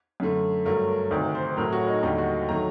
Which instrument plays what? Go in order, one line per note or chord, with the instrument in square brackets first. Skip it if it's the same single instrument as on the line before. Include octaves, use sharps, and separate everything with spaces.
[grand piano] F#2 D3 A3
G2 F#3 A3 A#4
A#4
D2 C3 D#3 D5
C5
A2 F#3 A3 A#4
F#4
D#4
D#2 D3 G3 D#4
F#4
D#3 F#3 A3 A#5